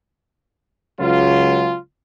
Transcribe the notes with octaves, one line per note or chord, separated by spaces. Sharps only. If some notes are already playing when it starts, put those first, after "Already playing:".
C#2 C#3 F#3 F4